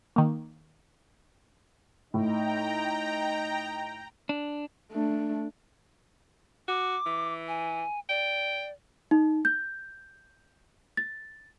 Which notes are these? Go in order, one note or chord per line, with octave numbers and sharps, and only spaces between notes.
D#3 A#3
A2 D#4 G5 A#5
D4
A3 D4
F#4 D6
E3
G#5
D5 G5
D#4
G6
A6